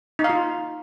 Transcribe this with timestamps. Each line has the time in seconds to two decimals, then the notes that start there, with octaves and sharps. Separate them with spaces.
0.19 D#4
0.24 F5
0.30 F4